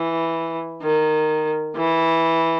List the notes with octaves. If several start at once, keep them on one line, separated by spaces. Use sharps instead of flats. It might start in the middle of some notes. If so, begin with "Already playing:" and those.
Already playing: E3
D#3
E3